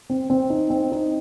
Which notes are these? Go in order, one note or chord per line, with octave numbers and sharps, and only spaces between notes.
C4
C4
D#4
C4
D#4